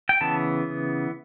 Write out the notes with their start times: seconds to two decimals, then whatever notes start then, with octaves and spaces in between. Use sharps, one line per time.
0.09 G5
0.21 C#3 E3 B3 A5